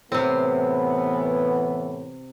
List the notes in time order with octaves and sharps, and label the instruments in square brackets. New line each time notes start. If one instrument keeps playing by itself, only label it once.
[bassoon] A2 [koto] C3 C4 [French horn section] E3 B3